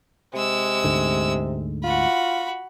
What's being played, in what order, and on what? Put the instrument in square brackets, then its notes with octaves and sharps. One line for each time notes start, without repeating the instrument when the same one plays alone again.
[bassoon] C3 [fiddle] G#3 E6
[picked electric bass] D2 G#2 D3
[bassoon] F4 [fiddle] F#4 B5